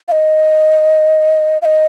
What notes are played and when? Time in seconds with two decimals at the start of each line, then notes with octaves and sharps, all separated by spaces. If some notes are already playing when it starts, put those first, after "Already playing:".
0.08 F5
0.12 D#5
1.62 F5
1.65 D#5